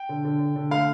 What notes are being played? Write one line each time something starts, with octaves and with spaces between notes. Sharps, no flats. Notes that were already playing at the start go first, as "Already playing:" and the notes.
Already playing: G5
D3
D3
D3
D3
A3 F5